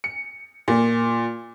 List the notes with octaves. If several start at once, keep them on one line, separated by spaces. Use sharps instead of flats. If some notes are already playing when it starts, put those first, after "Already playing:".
C#7
A#2